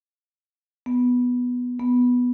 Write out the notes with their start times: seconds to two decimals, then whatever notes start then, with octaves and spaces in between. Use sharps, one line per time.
0.86 B3
1.79 B3